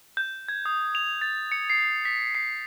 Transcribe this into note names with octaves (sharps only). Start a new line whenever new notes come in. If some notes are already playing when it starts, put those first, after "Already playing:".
G6
G#6
D#6
F7
A6
C#7
C7
B6
C7